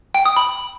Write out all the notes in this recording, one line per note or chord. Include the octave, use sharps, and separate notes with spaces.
G5
D#6
B5